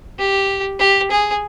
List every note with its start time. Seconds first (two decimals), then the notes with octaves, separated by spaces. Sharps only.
0.19 G4
0.80 G4
1.11 G#4